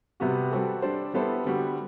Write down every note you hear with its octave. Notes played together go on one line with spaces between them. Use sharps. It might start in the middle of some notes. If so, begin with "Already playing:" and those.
C3 G3 B3 F#4
G3 C4 F#4 A4
G3 D4 A4 C5
G3 B3 E4 A4 C5
D3 G3 B3 F#4